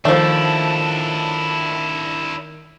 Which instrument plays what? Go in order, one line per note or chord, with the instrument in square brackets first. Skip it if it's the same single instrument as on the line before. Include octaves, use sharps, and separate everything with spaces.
[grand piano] D#3 [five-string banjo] F3 A3 [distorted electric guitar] D4 E4